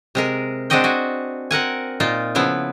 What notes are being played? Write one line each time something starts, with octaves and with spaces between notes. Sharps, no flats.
C3 G#3 A#4
G#3 C4 D4 F#4 D#5 G5
F#4 G#5
C4 A#4 F#5 G#5
A#2 D#4 F4
C#3 F3 B3 E4